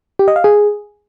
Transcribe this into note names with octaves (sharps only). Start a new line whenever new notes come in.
G4
D#5
F5
G#4